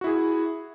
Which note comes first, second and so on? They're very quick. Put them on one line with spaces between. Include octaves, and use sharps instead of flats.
F#4 E4 G#4